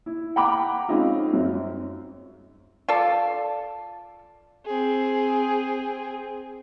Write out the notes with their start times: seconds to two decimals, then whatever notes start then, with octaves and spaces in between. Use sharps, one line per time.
0.06 E4
0.36 F#5 G5 A#5 B5 D6
0.89 G#3 C4 C#4 D#4 F4
1.33 F#2 C4
2.88 F4 A4 D5
4.66 C4 G#4